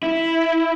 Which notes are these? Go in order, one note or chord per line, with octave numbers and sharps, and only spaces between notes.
E4